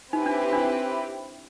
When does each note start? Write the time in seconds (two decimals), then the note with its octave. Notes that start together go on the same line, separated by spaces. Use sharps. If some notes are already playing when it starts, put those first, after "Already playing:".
0.13 C4 D#4 E4 G4 B4
0.26 D4
0.52 D4